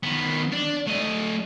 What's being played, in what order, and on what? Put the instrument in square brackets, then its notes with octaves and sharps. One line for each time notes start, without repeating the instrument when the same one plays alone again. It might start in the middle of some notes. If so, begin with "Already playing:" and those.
[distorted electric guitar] D#3 B3
D4
A3 D#5